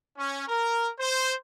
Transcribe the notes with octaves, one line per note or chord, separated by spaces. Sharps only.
C#4
A#4
C5